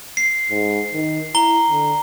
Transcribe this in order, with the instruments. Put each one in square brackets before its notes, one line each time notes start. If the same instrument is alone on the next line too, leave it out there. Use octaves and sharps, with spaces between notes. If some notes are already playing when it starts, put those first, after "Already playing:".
[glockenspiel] C7
[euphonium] G#2
D#3
[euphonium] E4 [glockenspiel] A#5 G7
[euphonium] D3